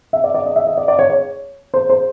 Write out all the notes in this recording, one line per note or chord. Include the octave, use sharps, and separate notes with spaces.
E5
D5
D5
D#5
E5
D#5
D5
D5
C#5
C#5
C5
C5